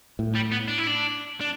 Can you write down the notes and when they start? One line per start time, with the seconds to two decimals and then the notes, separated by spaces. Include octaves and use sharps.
0.19 A2
0.35 G3
0.52 B3
0.68 D4
0.78 E4
0.87 D4
1.41 D4